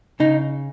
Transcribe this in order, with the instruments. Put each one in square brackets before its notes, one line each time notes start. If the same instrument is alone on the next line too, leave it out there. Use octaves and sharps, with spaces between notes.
[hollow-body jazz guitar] C#3 D#4